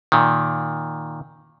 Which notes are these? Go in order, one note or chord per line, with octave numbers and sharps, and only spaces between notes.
A#2 D#3